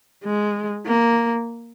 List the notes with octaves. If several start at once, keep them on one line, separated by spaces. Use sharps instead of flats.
G#3
A#3